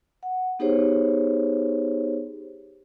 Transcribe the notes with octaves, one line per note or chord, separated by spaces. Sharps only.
F#5
B3 D#4 G4 G#4 C5 C#5